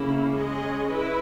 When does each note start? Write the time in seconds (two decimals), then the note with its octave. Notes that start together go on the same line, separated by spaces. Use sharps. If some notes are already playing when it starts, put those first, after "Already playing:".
Already playing: C#3 A#3 C#4 E4
0.33 G#3 C#4 G#4 D#5
0.90 E4 B4